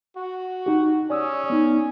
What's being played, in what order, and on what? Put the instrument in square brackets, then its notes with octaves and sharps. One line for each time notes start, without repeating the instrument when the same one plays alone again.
[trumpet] F#4
[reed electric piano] D#4 G4
[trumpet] C#4 [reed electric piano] D5 D#6 E6
[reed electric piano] B3 D#4